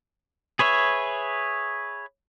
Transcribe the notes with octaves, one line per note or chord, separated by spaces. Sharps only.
G#4 B4 C#5 E5